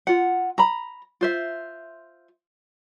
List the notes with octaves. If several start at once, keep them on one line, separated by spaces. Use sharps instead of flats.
F4 F#5
A#5 B5
F4 C5 E5